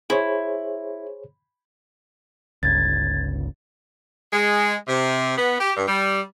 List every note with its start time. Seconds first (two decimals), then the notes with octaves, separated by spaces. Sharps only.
0.10 E4 G#4 C5 C#5
2.63 G1 C#2 G#6 A6
4.33 G#3
4.88 C3
5.37 B3
5.59 G4
5.77 G2
5.88 G3